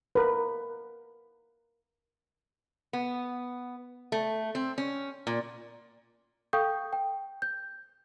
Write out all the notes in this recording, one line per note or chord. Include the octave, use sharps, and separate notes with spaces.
A#4 B4
B3
A3
C4
C#4
A#2
A4 F5 G5 C#6 D#6 G6
G5
G6